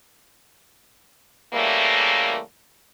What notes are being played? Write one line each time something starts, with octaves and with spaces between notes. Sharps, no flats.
C#3 E3 G3 A3 A#3